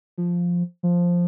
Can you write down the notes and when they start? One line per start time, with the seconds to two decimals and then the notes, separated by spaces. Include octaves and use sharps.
0.18 F3
0.83 F3